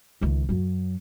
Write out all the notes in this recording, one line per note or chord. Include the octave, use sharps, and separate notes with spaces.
C#2 D#3
F#2 F#3